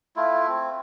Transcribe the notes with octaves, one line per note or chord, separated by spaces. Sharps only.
A3 E4 F4
C4